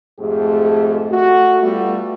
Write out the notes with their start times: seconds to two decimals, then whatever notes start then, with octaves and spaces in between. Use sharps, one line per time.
0.19 F2 G#2 A3 G4 G#4
1.10 A3 F#4
1.62 G3 A3 B3 F4 F#4